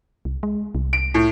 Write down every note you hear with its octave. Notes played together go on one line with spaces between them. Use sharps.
C2
G#3
C2
D7
A2